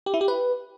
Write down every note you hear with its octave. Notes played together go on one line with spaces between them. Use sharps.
G4
E4
G4
B4